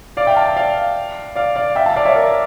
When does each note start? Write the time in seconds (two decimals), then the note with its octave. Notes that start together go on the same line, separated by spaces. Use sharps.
0.17 D5 F5
0.26 E5 G5
0.37 F5 A5
0.57 D5 F5
1.36 D5 F5
1.56 D5 F5
1.75 E5 G5
1.86 F5 A5
1.96 D5 F5
2.05 C#5 E5
2.15 A#4 D5